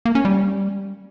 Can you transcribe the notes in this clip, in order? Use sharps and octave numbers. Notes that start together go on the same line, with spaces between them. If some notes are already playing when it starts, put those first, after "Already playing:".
A#3
C#4
G3